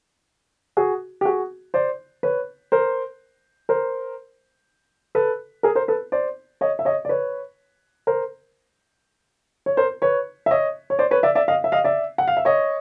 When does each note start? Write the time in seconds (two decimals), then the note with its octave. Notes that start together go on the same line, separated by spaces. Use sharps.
0.77 F#4 G#4
1.21 G4
1.25 F#4 G#4
1.74 C5 D5
2.23 B4 C#5
2.72 A#4 C5
3.69 A#4 C5
5.15 A4 B4
5.63 G#4 A#4
5.75 A#4 C5
5.88 A4 B4
6.12 C5 D5
6.61 C#5 D#5
6.79 E5
6.85 C#5 D#5
7.05 D5
7.09 B4 C#5
8.07 A#4 C5
9.66 C#5
9.77 A#4 C5
10.02 B4 C#5
10.46 E5
10.51 C#5 D#5
10.90 C#5
10.99 C5 D5
11.11 B4 C#5
11.23 D5 E5
11.35 D5 E5
11.48 D#5 F5
11.64 E5
11.72 D#5 F5
11.84 D5 E5
12.18 F#5
12.28 F5
12.37 E5
12.45 C#5 D#5